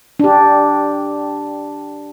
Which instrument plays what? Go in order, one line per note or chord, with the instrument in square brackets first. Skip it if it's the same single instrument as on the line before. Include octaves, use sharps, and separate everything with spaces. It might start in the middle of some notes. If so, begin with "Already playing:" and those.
[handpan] D4 G4